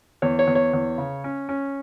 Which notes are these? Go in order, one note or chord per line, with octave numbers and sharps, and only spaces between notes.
E2 C#5
C#5
E2
C#5
E2
C#3
C#4
C#4